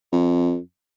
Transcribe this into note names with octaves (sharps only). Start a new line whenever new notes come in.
F2